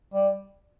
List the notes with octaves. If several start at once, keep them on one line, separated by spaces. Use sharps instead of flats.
G3